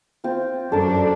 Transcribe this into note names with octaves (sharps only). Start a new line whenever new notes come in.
C4 F4
F#2 D4 A4 A#4